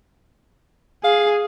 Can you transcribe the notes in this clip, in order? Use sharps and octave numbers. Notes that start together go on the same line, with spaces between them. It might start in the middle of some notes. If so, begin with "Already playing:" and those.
G#4 F5